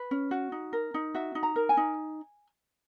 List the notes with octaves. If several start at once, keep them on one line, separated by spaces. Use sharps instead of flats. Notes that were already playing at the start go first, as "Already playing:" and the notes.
Already playing: B4
C#4
F#4
D#4
A#4
D#4
F#4 E5
D#4
A#5
A#4
G#5
D#4